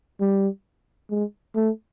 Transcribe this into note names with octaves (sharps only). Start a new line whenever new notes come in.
G3
G#3
A3